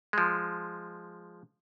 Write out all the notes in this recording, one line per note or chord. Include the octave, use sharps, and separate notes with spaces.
F3 G#3